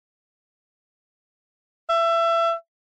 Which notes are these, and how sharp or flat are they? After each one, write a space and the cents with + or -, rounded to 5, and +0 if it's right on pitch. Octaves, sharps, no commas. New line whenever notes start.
E5 +25